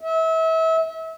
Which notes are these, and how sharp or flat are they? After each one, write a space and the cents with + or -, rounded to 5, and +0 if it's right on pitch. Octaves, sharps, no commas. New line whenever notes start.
E5 -30